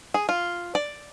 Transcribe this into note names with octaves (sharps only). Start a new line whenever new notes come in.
G#4
F4
D5